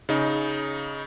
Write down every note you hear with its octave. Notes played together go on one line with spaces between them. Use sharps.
C#3 D#4